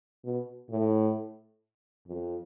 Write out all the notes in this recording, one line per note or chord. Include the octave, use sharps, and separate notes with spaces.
B2
A2
F2